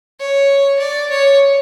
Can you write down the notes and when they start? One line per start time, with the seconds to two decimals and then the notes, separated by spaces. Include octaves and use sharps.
0.19 C#5
0.79 D5
1.10 C#5